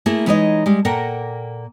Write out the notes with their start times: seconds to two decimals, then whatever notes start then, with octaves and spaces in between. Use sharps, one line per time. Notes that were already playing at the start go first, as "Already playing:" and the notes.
0.06 A3 A#3 E4 G#4
0.27 E3 G#3 D#4 C#5 D#5
0.66 G3 G#3
0.85 A#2 A#3 A4 A#4 F#5 G5